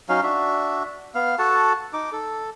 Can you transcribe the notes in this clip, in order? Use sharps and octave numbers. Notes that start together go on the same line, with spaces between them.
F#3 C#4 D#4 F5
D4 F#4 E5
B3 F5
F#4 A4 F#5 A5
D#4 D6
A4